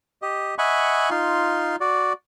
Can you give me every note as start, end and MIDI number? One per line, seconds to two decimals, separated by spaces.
0.22 0.55 67
0.22 0.55 75
0.58 1.10 75
0.58 1.10 76
0.58 1.10 78
0.58 1.10 80
0.58 1.10 83
0.58 1.10 85
1.10 1.76 63
1.10 1.76 65
1.10 1.76 84
1.81 2.13 66
1.81 2.13 74